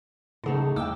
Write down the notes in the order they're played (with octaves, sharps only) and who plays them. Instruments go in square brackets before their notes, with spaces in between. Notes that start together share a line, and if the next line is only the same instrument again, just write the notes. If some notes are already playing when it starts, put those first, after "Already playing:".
[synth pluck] A2 C#3 [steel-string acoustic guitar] A3 D#4 F#5
[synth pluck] D#2 D6 E6 [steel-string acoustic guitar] A3 E4 G5